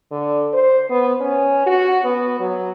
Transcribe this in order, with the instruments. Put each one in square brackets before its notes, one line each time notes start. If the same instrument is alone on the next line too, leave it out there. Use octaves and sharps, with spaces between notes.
[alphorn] D3
C5
B3
C#4
F#4
B3
F#3